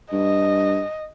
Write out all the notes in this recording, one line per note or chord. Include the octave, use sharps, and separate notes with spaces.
G2 D#5